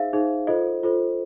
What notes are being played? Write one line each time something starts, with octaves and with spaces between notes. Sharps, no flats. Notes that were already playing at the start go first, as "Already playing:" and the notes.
Already playing: D#4 G#4 C5 E5 F5
D#4 G#4 C5
F4 A4 C5 D#5
F4 A4 C5